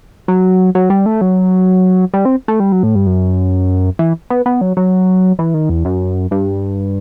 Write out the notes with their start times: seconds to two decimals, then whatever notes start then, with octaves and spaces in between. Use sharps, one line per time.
0.28 F#3
0.75 F#3
0.90 G3
1.06 A3
1.21 F#3
2.14 G3
2.25 C4
2.48 A3
2.60 G3
2.72 F#3
2.83 A2
2.95 G2
3.06 F#2
3.99 E3
4.30 B3
4.46 B3
4.61 F#3
4.77 F#3
5.39 E3
5.54 D#3
5.69 E2
5.85 F#2
6.31 G2